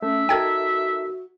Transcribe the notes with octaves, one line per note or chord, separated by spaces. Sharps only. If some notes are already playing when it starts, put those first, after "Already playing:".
A3 C#4 E5
D#4 F#4 A4 A#4 G5 G#6